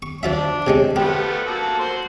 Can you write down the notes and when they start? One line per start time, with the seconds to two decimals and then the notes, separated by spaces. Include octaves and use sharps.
0.02 C#6
0.23 F3 D4 F4 E5
0.67 C3 G#3 C#4
0.96 F3 A3 B3 G4
1.46 A#3 F#4 A4
1.79 F#4 C5 C6